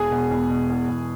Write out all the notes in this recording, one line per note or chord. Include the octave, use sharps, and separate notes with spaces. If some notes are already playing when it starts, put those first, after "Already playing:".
Already playing: E1 G#4 G#5
B2
E2
B2
E2
E2